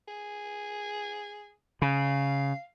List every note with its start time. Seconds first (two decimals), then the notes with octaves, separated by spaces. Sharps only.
0.08 G#4
1.82 C#3 F5